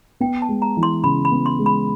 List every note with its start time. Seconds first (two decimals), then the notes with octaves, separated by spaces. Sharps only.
0.20 B3 G5
0.42 A5
0.49 G#3
0.62 A#5
0.77 E3
0.83 C6
1.04 C#3 B5
1.25 B5
1.32 B3
1.46 C6
1.59 G#3
1.66 B5